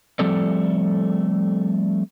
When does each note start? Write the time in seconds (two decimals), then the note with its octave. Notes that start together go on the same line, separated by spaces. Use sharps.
0.19 F3 G3 A3 C4 A4 D5